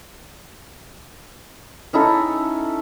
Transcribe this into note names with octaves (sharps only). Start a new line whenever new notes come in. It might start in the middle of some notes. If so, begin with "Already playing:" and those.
C#4 D#4 E4 A4